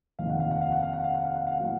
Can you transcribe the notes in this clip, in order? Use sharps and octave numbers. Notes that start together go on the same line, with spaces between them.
F1 D#2 D#3 F5
F#5
F5
F#5
F5
F#5
F5
F#5
F5
F#5
F5
F#5
F5
A2 F#3 A#3 F#5